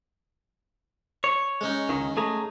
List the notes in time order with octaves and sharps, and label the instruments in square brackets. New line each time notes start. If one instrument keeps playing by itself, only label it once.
[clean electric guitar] C#5
[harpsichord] G#3 C#4 D#4
[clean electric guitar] C#2 D#3
A3 G#4 A#5